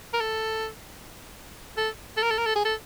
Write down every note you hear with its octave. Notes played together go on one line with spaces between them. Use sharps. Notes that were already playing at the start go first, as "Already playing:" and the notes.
A#4
A4
A4
A4
A#4
A4
A#4
A4
G#4
A4